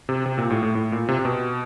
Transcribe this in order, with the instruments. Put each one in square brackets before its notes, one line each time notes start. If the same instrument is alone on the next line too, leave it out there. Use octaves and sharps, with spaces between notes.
[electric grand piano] C3
C3
A#2
A2
A2
A2
A#2
C3
C3
B2